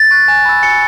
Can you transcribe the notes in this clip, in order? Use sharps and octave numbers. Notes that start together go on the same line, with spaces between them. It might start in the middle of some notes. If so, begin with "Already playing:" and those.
Already playing: A6
C#6 F#6
G#5
B5 E6
G#5 C#7